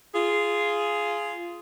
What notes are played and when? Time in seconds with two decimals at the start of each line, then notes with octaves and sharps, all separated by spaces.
0.14 F4 G#4